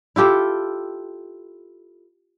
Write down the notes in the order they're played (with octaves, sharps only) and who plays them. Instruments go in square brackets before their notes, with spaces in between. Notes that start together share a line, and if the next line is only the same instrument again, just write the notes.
[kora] E4 F4 G4 A4